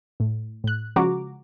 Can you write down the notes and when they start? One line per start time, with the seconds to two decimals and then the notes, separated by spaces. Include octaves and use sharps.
0.20 A2
0.64 A2 F#6
0.96 C#3 F3 G#3 F#4 A#5 D6